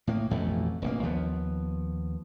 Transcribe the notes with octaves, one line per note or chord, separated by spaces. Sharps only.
A2 A#3
A1 F2 B2 A3
F1 A#1 A#3
D#2 F3 B3